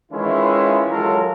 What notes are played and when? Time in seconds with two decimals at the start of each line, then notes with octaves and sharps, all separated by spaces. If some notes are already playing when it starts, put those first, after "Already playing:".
0.12 D#3 E3 G#3 C#4 E4 F4
0.91 F#3 G#3 F4 A4 A#4